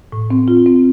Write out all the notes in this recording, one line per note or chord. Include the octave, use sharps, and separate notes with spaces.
A2
C4
F4
C4